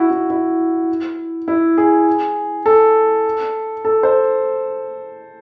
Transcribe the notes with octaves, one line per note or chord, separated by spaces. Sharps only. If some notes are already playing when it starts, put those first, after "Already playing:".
Already playing: E4 F#4
E4
E4
E4
G#4
A4
A4
C5